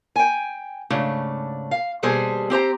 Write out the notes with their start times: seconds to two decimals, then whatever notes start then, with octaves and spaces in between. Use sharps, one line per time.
0.16 G5 G#5
0.90 G#2 C#3 A3 D4
1.71 F5
2.03 D#2 B2 G3 G#4 A4 C5
2.50 C4 G4 C5 A#5